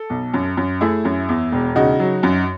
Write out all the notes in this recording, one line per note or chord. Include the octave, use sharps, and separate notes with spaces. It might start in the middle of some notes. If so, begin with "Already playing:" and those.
Already playing: A4
B1
F#2
F#2
A3 E4 G#4
F#2
E2
E1
C#3 D#4 F#4
F#3
F#2